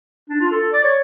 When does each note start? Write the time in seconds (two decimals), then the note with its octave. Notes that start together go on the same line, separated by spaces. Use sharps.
0.30 D4
0.40 F4
0.51 A4
0.73 D5
0.83 C#5